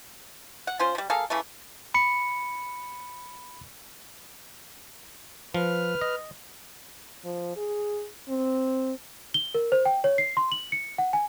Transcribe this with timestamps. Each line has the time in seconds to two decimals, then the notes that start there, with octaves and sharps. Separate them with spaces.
0.67 F#5
0.79 C#4 F4 C5
0.95 F3 G3
1.10 A#3 G#4 A4 F5
1.30 C#3 E3 A3
1.94 B5 C#7
5.54 F3 B4 F6
6.01 D#5
7.25 F3
7.56 G#4
8.29 C4
9.34 G7
9.55 A#4
9.72 C5
9.85 G5
10.04 C#5
10.18 C7
10.37 C6
10.52 F#7
10.72 C#7
10.98 F#5
11.13 G#5